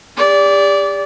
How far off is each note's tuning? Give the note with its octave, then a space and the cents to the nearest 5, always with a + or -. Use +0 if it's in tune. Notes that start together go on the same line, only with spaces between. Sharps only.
G4 +40 D5 -20